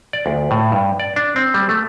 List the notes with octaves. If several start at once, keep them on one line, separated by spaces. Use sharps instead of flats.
D5
D2
A2
G2
D5
D4
C4
G3
A3